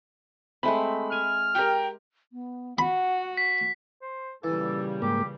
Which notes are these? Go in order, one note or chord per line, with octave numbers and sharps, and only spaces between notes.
G#3 A3 C4 B5
G#5 F6
G4 A#4 G5
B3
F#4 F#5 B5
B6
C5
A#2 C#3 E3 G3 A4
G#2 A#3 G4